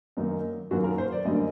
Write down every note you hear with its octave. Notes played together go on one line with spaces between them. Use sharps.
F#2 D#3 F#3 A#3 D#4
F#2 D#3 F#3 A#3 F#4
A#4
C5
D5
F#2 D3 G3 A#3 D#5